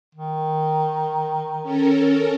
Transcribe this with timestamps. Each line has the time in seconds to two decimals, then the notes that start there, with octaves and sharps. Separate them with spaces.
0.15 D#3
1.62 C#4 A4 A#4